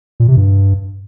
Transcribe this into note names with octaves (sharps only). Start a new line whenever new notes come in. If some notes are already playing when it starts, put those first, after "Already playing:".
A#2
C3
G2